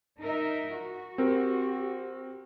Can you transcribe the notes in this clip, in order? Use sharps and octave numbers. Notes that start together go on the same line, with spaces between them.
D#4 A#4 E5
F#4
C4 G4 A#4